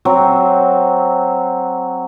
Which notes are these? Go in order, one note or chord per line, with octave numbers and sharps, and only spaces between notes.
F#3 C4